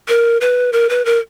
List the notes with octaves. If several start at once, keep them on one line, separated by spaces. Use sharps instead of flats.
A#4
B4
A#4
B4
A#4